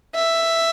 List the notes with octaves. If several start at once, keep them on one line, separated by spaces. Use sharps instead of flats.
E5